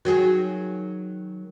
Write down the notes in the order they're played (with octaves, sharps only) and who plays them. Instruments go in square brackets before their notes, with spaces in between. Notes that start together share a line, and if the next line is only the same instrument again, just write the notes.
[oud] D#3 F#3 G#4 [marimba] F#4